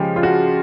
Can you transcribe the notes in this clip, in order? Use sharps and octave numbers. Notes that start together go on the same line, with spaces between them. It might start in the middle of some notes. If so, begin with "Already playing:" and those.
Already playing: C#3 F3 G#3 G4
F4
F#4